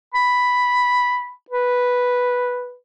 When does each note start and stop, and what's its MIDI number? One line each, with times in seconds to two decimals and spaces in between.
0.15 1.31 83
1.50 2.74 71